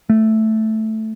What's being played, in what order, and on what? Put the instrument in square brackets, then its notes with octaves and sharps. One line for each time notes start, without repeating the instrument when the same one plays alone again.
[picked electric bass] A3